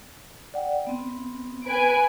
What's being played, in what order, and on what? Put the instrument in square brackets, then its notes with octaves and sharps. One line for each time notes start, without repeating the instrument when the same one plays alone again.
[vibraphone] D5 F#5 G5
B3 C4
[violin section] B4 G#5 D7